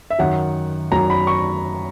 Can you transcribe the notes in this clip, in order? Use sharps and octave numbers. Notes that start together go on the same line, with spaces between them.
E5
F#2 D#3 F#3 F#5
F#2 D#3 F#3 A#5
B5
C#6